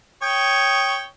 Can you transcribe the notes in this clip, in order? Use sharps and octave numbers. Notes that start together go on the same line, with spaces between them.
C#5 G5 D#6